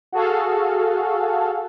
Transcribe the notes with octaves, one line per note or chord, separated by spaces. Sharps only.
F#4 G#4 A4 F5